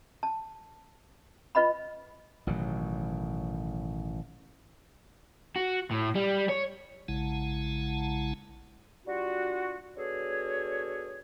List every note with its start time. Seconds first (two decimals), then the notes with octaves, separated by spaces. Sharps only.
0.23 A5
1.55 F4 B4 D#5 F#5 B5
2.47 A1 B2 D#3 F#3
5.56 F#4
5.91 A2
6.15 G3
6.49 C#5
7.08 A#1 C#3 G#3 E4 F#5 A5
9.07 G3 D4 F4 F#4
9.96 B3 D4 F#4 G#4 A4 C#5